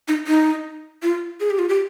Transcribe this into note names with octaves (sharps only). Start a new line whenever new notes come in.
D#4
D#4
F4
G#4
G4
F4
G4